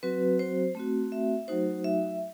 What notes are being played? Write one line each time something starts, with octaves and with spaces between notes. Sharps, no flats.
F#3 C4 F#4 B4
C5
A3 C4 F#4
E5
F#3 A3 D#4 F#4 C5
E5